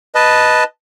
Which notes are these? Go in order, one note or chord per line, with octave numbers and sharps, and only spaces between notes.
B4 D#5 A5